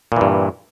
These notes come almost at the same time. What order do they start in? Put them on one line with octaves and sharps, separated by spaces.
A#2 E3 G2